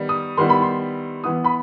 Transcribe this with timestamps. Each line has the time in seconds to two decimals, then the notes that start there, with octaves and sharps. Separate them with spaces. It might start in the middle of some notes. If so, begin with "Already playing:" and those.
Already playing: D#3 G3 B3
0.09 D#6
0.37 D#3 G3 B3 E4 C6
0.49 B5
0.62 C6
1.24 E3 B3 E4 D#6
1.44 B5